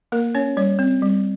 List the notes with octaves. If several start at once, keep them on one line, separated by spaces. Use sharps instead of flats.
A#3 A#4
C#4 C#5
G3 C#5
C4
G3